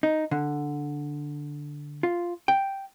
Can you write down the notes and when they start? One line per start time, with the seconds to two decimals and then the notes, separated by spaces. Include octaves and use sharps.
0.03 D#4
0.31 D3
2.03 F4
2.48 G5